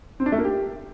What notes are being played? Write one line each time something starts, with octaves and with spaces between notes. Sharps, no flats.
C4
D4
A3
A#3
G4